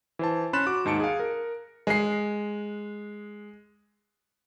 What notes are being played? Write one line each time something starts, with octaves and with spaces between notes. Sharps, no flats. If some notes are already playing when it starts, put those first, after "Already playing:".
E3 C5 A5
C#4 B5 C6 F#6 A6 E7
F#4 D6
D#2 G#2 D#4 A5 C#7 D7
G#4 F5
A#4
G#3 C7